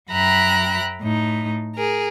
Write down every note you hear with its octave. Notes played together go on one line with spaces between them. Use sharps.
F#2 E5 G5 A#5 B5 F#6
A2 D#4
G#4 A#4